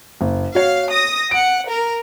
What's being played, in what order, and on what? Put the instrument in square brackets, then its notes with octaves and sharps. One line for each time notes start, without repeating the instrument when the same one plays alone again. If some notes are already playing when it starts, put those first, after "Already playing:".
[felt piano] F#1
[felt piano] F#4 C#5 [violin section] F5
[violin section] D#6 A#6
[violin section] F#5 [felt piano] D7
[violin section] A#4